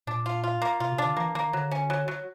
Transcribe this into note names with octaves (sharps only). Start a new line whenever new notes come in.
A#2 D4
F4
F4
A#3
B2 F4
C3
D4
D3
E3 A#3
D#3 A#3
D3 F#3
C#4
F#3
F#3